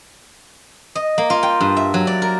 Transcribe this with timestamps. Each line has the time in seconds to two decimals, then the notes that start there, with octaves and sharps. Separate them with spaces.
0.95 D#5
1.18 A#3
1.30 F4
1.43 G5
1.60 G2
1.77 E5
1.94 F#3
2.07 D5
2.22 A#4